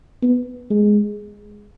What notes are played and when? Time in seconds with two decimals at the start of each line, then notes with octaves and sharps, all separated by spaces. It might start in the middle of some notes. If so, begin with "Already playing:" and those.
0.23 B3
0.70 G#3